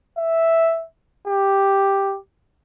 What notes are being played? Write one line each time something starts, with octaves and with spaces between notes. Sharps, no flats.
E5
G4